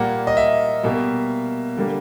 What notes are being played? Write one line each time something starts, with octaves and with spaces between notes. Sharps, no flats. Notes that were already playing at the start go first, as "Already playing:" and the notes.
Already playing: A#2 G3 A#3 F#5
D#5
E5
B2 G3 A#3
D3 G3 A#3